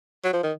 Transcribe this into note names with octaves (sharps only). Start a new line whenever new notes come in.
F#3
F3
D#3